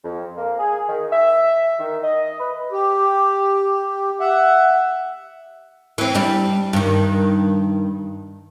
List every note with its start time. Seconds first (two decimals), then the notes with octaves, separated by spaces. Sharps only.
0.04 F2
0.37 A#3
0.59 G#4
0.88 D#3
1.12 E5
1.79 D#3
2.04 D#5
2.40 B4
2.72 G4
4.20 E5 F#5
5.98 E3 C4
6.14 G3 D4
6.73 G2 D#3